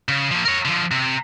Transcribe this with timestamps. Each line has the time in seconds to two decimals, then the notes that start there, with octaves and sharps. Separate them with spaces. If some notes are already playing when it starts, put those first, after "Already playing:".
0.09 C#3
0.31 F3 A#3
0.45 A#4 C#5
0.65 D3 F3
0.91 C3